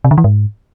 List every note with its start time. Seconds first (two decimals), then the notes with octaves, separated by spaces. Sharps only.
0.04 C3
0.11 D3
0.18 E3
0.24 G#2